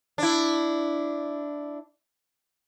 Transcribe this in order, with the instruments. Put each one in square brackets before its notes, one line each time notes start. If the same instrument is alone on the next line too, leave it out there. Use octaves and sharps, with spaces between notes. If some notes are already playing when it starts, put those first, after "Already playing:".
[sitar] D4 E4